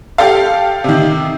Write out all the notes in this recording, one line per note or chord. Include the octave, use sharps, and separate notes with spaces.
G4 A4 F5
C3 D#3